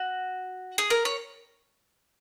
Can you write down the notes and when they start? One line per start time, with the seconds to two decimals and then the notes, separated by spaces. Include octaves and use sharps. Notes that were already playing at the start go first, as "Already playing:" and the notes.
Already playing: F#4
0.78 G#4
0.90 A#4
1.05 C#5